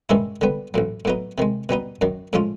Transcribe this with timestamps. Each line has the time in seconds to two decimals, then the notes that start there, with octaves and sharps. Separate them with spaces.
0.09 G2 D#3 G#3 C#4 E4
0.41 D3 G3 B3
0.74 A1 A2 F#3
1.05 A2 F#3 B3 D#4
1.38 C3 D#3 G#3
1.69 B2 G3 B3 D#4
2.01 F#2 D#3 F#3
2.33 A2 F3 G#3 C#4 F4